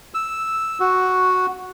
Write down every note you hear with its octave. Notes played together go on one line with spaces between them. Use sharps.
E6
F#4